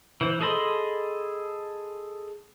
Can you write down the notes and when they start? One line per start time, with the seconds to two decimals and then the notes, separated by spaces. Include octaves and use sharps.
0.21 E3 C5
0.41 G#4 A4 D#5 B5 C6